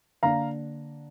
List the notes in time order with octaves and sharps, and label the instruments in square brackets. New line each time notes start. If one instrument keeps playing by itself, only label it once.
[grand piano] D3 A#3 D4 F5 A#5